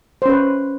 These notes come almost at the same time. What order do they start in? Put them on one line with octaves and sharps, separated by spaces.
C5 C#4 B4